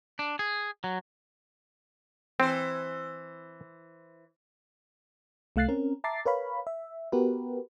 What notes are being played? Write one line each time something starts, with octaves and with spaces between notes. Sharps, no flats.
D4
G#4
F#3
E3 C4 C5
C2 A3 F5 F#6 A6 C7
C4 C#4 A#4
E5 A5 A#5 D6 A6 C7
A#4 B4 C#5 F5 B5
E5
B3 F#4 G4 A#4 B4